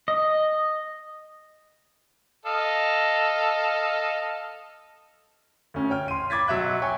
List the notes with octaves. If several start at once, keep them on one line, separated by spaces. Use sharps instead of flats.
D#5
A4 D#5 F5
D2 C#4
C#5 G5 F6
C6 D#7
B5 D6 G#6 A6 B6
B1 F#3 E5 F#6
C#5 G5 G#5 C#6